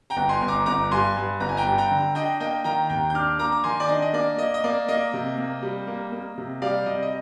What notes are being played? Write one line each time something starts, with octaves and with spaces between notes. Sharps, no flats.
G5 A#5
G1
G#5 C6
G1
A#5 D6
G1 A#5 D6
G2 G#5 C6
G2
G1 A#5
G#5
G5 A#5
G2
G5 A#5
D3
D4 D#5 G5
A#3 D#5 G5
D#3 G5 A#5
D#2 G5 A#5
G6
D4 D6 F6
A#3 A#5 D6
D6
D#3 G#5 C6
D5
D4 D#5
D#5
A#3 D5
A#3 D#5
D#5
A#3 D5
A#3 D#5
C3
A#3
G3
A#3
A#3
C3
G3 D5 F5
C3 D#5
D#5